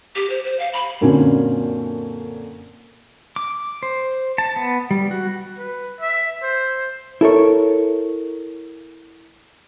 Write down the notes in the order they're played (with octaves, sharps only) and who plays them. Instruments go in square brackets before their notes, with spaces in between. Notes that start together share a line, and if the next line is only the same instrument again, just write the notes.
[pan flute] G4
C5
C5
F5
B5
[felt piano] F#2 A#2 D3 C4 C#4
[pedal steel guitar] D6
C5
A5
B3
G3
F#4
[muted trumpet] B4
E5
C5
[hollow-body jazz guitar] E4 A4 A#4 C#5